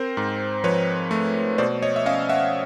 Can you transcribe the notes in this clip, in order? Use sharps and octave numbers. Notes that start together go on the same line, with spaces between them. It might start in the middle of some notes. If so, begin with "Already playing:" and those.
Already playing: C4 A#4 C5
G#2
F3 B4 C#5
A3
B2 C5 D5
C#5 D#5
E5
C#4 D#5 F5
E5 F#5